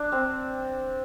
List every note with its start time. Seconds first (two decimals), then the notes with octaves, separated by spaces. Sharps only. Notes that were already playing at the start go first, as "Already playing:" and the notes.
Already playing: D4
0.12 C4